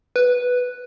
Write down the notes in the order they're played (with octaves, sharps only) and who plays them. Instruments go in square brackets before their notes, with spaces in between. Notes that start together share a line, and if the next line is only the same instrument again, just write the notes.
[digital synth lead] B4